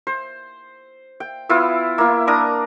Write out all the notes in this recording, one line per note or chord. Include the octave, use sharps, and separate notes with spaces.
C5
G5
B3 E4 F4 E6
A#3 E4
D4 A#4 A#5 D#6